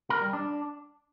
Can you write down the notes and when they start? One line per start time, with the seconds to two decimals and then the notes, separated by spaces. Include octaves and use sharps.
0.10 A#4
0.22 G3
0.33 D4